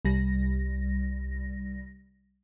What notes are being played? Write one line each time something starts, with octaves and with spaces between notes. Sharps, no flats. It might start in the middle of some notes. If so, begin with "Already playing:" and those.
C2 G3 A#6